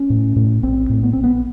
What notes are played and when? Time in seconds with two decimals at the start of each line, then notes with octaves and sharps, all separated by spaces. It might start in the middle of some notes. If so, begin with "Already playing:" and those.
Already playing: C#4
0.10 A2
0.36 A2
0.63 A#1 C4
0.90 A2
1.03 B3
1.13 A#1 C4
1.24 B3